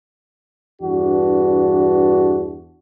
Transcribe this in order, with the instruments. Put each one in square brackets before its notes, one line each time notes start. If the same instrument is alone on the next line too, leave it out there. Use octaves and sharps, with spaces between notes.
[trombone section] E2 G2 D4 F#4